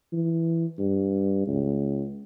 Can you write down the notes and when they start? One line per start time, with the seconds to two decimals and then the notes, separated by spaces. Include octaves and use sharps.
0.13 E3
0.79 G2
1.47 C#2